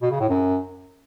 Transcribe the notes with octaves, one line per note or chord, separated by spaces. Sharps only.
B2
C#3
A2
F#2